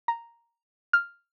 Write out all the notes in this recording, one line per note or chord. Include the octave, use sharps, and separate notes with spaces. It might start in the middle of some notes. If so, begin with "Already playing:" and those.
A#5
F6